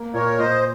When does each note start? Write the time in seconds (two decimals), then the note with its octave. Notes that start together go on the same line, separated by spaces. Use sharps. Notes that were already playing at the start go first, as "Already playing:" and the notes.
Already playing: A#3
0.14 A#2 A#4 C#5
0.39 A#2 C5 D#5